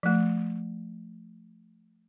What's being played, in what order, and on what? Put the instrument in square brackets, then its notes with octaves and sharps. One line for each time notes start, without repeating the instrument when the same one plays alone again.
[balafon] F3 A3